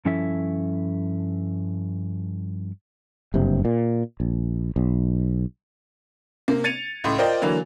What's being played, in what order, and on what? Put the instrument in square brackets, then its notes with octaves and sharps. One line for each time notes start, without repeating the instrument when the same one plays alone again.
[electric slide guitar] G2 F3 C#4 E4 A4 E5
[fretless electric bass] F#1 G2 C3
A#2
A#1
B1
[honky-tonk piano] C3 A#3
G#6 A6 C#7 D#7 F7
C#2 A2 C6
F4 A#4 C5 D5 D#5 G5
D3 E3 F#3 A#3